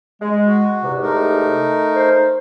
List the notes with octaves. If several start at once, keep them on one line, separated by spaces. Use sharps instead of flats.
G#3
F#4
E2 G#2 C3
A3 D#4 A#4
C5